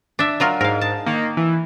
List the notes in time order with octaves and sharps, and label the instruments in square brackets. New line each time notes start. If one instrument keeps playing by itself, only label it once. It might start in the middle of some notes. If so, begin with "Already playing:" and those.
[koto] D4 E5
F#3 F4 A#4
[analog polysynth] G#2 [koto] A#4 F5
[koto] A5
[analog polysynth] D#3 A#3
E3